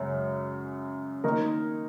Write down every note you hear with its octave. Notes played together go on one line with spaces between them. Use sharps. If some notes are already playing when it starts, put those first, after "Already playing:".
Already playing: F#2 C#3 G#3 C#4
D#3 A#3 D#4 A#4